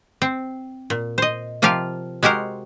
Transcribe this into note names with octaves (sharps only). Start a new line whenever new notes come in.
C4
A#2
C5 D#5
C3 F3 F4 G4 A#4 F5
G#3 F#4 G4 A#4 C5